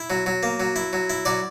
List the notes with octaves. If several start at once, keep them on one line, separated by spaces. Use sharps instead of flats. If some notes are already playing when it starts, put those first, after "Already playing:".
Already playing: E4
F#3
F#3
A#3
F#3
E4
F#3
E4
F#3 D5